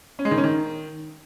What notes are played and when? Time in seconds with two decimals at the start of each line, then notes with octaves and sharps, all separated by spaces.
0.19 C#4
0.25 G#3
0.31 D#3
0.37 C#4
0.44 D#3